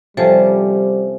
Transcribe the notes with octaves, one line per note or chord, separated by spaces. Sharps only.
C3 F3 G3 C#4 A4 C5 A5